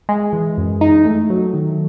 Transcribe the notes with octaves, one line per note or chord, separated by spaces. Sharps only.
G#3
E3
F#2
D#4
A3
F#3
D#3